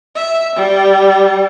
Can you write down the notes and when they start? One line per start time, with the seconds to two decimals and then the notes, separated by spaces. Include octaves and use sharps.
0.16 E5
0.56 G3